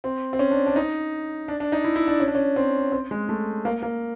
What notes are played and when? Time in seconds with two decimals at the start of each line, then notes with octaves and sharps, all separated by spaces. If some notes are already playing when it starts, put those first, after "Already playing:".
0.04 C4
0.33 C4
0.39 C#4
0.51 D4
0.67 D4
0.76 D#4
1.48 D4
1.60 D4
1.72 D#4
1.84 E4
1.96 E4
2.08 D4
2.20 C#4
2.28 D4
2.35 C#4
2.56 C4
2.92 C4
3.11 G#3
3.29 A3
3.65 A#3
3.82 A#3